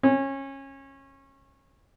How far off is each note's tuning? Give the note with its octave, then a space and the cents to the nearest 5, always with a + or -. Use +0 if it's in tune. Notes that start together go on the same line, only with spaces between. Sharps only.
C#4 -25